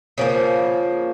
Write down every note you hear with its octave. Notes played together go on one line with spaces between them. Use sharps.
C#3 F3 A#3